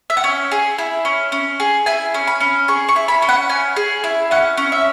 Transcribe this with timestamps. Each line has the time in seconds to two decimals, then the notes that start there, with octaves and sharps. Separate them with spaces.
0.10 E5
0.17 F#5
0.24 C#4 G#5
0.52 G#4
0.78 E4
1.05 C#4
1.32 C#4
1.60 G#4
1.86 E4 G#5
2.14 C#4
2.27 B5
2.40 C#4
2.68 G#4 C#6
2.89 C#6
2.96 E4
3.08 B5
3.22 C#4
3.29 F#5
3.49 C#4 G#5
3.76 G#4
4.04 E4
4.31 C#4 F#5
4.57 C#4
4.72 E5